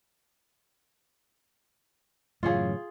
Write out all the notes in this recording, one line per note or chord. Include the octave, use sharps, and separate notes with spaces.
F#2 A2 C#3 E3 F4 G#4 C#5 F5